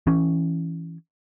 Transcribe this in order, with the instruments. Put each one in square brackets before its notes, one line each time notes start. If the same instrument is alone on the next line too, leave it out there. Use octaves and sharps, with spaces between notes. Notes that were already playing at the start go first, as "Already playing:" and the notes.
[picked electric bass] E3 C#4